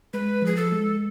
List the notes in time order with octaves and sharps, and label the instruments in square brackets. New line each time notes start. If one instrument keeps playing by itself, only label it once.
[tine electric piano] G#3 [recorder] B4
[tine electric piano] F3 [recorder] G#4
[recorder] A4
[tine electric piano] G#3